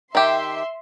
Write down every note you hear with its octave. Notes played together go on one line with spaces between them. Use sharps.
D#3 G4 E5 C6